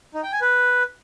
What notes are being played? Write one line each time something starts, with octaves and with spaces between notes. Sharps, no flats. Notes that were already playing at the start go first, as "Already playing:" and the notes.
D#4
G5
G#5
B4